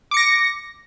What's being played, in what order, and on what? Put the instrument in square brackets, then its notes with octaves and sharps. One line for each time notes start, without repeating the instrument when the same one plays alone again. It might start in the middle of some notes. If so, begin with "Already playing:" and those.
[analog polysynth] D6
C#7
A#6